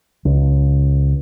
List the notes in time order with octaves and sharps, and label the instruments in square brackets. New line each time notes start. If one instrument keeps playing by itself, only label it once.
[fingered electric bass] C#2